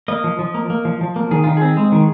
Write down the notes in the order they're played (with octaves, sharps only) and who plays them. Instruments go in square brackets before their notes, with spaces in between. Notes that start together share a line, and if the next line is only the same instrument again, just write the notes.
[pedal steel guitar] A#3 D#5
F3
F3
A#3
A#3
F3
F3
A#3
D#3 G#4
D#3 F4
C4 G#4
G#3
D#3